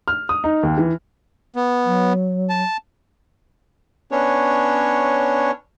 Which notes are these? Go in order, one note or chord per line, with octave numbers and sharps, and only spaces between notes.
F6
D#6
D#4
D#2
E3
B3
F#3
A5
B3 C#4 D4 C#5